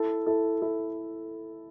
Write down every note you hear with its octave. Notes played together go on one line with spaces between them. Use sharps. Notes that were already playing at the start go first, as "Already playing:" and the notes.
Already playing: E4 A4
E4 A4
E4 A4